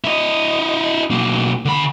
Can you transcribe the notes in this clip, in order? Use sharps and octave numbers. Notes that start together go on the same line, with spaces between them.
E4 D#5
B1 A#3
D3 B5